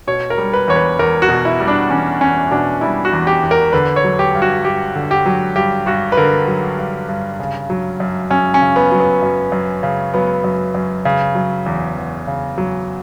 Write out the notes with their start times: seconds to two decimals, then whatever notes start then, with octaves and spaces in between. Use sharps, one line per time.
0.07 B2 C#5
0.30 A#4
0.38 G3
0.53 B4
0.68 E2 C#5
0.76 B4
0.99 E2 A#4
1.22 F#4
1.29 B2
1.45 E4
1.60 G3
1.68 D4
1.90 E2 C#4
2.21 E2 C#4
2.51 B2 D4
2.81 G3 E4
3.05 F#4
3.13 E2
3.27 G4
3.43 E2
3.51 A#4
3.73 D3 B4
3.96 C#5
4.04 F#3
4.19 G4
4.35 G2
4.42 F#4
4.65 G2 G4
4.95 D3
5.11 G4
5.26 F#3
5.56 G2 G4
5.86 G2 F#4
6.12 B4
6.17 D3 A#4
6.48 F#3
6.78 G2
7.09 G2
7.39 C#3
7.70 F#3
8.00 F#2
8.30 F#2 C#4
8.54 C#4
8.62 C#3
8.76 B3
8.92 F#3
8.99 B3
9.22 F#2
9.52 F#2
9.83 C#3
10.14 F#3 B3
10.44 F#2
10.75 F#2
11.05 C#3
11.35 F#3
11.66 E2
11.97 E2
12.27 C#3
12.58 F#3